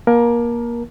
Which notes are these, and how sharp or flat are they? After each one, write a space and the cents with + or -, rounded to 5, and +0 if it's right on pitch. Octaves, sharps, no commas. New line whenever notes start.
A#3 +25 A#4 +20 A5 +0